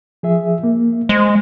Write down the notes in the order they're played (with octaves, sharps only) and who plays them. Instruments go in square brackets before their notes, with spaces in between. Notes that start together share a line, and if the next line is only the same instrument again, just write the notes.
[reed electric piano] F3 G#4 E5
A#3
[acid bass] G#3 [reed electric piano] C5 C6